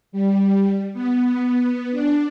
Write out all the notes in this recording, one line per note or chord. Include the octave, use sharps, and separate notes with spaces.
G3
B3
D4